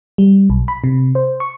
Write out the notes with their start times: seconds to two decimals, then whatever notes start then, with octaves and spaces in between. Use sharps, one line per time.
0.18 G3
0.50 B1
0.68 B5
0.84 C3
1.15 C5
1.40 C#6